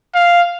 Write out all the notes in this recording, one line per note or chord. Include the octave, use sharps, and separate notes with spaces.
F5